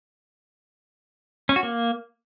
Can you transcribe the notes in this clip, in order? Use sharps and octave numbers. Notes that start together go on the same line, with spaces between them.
C#4
F#4
A#3